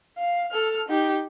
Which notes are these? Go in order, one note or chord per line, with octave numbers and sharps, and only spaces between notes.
F5
A4 F6
D#4 G4